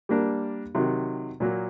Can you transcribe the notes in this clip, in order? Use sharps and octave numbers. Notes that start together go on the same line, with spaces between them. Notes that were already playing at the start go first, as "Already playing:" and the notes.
G3 A#3 D4
C3 D#3 F#3
A#2 F#3 A#3